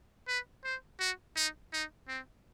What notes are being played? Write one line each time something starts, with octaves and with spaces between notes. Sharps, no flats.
B4
C5
F#4
D#4
D#4
C4